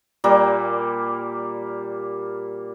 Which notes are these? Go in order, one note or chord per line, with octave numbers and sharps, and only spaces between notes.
A#2 G3 A#3